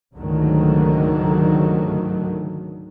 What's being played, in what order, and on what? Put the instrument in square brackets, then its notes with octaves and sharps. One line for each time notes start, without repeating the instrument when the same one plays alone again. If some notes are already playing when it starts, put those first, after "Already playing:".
[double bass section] C#2 G#2 D3 D#3 F#3 A3